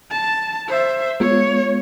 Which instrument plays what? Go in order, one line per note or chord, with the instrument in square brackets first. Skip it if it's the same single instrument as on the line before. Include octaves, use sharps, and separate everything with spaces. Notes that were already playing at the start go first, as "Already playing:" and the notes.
[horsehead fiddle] A5
C5 E5
[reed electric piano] G#3 B3 F4 [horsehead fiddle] C#5